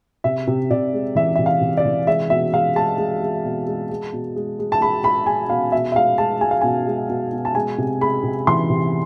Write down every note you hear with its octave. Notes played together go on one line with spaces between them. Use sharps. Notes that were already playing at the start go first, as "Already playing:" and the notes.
C3 E5
C3
C3 D5
G#3
E3 E5
C3 E5
F5
C3
D5
E3
G#3 E5
B2 E5
G#3 F5
G#3 A5
G#3
G#3
B2
G#3
G#3
B2
G#3
G#3
A5
G#3 B5
G#3 B5
G#3 G#5
B2 F5
B2 E5
E5
G#3 F5
G#3 A5
G#3 G#5
F5
B2 G#5
G#3
B2
B2
A5
G#3 G#5
C3
G#3 B5
C3
E3 C6
C3